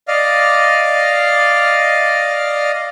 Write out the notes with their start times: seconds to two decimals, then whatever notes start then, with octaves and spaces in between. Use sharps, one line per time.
0.08 D5 D#5 F5 F6